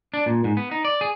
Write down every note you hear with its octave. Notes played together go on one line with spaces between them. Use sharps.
D4
A#2
G#2
B3
D#4
D5
G#4